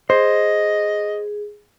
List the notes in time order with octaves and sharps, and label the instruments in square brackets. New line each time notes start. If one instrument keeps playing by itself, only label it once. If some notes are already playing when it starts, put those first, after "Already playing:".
[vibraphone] G#4 [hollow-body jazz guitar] C5 [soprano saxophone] D#5